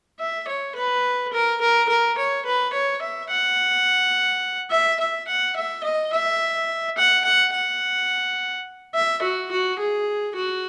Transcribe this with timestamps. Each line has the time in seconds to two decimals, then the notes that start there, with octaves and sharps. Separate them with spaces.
0.20 E5
0.48 C#5
0.76 B4
1.33 A#4
1.61 A#4
1.89 A#4
2.18 C#5
2.46 B4
2.73 C#5
3.02 E5
3.30 F#5
4.71 E5
5.00 E5
5.28 F#5
5.56 E5
5.84 D#5
6.13 E5
6.98 F#5
7.25 F#5
7.53 F#5
8.95 E5
9.22 F#4
9.51 F#4
9.79 G#4
10.36 F#4